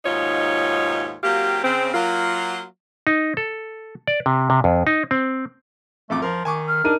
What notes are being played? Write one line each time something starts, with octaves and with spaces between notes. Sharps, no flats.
D#2 G#2 B2 D#4 F4 C#5
F#3 A#3 C4 F4 G4
C#3 C4
F#3 A#3 F4
D#4
A4
D5
C3
C3
F2
D#4
C4
A1 F2 A3 D6
F3 A#4
D#3 G#5 C#6 D6
F6
D4 D#4 A#4 D#7